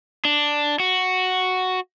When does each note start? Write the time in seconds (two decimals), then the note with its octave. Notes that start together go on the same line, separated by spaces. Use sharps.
0.25 D4
0.80 F#4